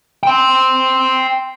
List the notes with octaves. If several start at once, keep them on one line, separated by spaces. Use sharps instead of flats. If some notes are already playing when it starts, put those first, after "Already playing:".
G5 C6